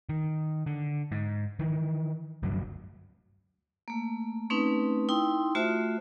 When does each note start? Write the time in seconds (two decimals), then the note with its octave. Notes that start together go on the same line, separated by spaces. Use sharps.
0.09 D#3
0.66 D3
1.12 G#2
1.59 D#3 E3
2.43 F1 D2 G2 F#3
3.88 A3 A#3
4.50 A3 C4 C#4 D#4 B4
5.09 D#4 E4 G5 C6
5.55 A3 F4 F#4 C5 E5